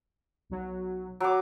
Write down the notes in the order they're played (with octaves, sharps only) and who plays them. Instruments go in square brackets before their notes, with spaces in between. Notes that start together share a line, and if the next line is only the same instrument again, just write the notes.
[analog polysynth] B1 F#3
[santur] F#3 D6